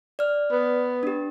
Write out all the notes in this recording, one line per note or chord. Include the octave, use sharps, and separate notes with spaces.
D5 F6
B3
D4 G4